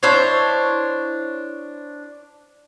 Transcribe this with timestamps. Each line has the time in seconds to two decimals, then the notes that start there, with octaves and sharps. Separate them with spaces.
0.03 D4 E4 C5 C#5